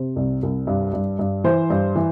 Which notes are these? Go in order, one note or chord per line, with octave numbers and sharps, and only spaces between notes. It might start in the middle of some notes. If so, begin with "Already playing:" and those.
Already playing: C3 C5
C2
C2
G2
G2
G2
E3 C5
G2
E3